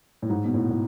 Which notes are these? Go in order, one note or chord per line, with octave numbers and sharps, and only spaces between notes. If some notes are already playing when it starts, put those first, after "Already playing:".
A2
G#2
B2
A2
A2